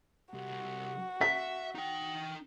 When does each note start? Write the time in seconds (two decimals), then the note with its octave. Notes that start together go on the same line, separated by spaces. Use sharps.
0.34 C2 F#4
1.21 E5 B6
1.75 D#4 G5